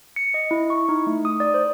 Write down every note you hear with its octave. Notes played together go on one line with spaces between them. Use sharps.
C#7
D#5
E4
C#6
D#4
A3
D#6
D5
C5